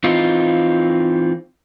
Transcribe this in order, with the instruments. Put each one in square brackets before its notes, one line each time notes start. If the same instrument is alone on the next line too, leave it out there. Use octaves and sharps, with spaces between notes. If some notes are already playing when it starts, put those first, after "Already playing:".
[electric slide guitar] E3 C4 D#4 F4